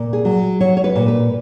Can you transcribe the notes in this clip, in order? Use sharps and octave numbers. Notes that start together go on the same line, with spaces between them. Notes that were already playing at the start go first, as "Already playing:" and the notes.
Already playing: A#2
G#4
F#3
F#3 C#5
C#5
B4
A#2
B4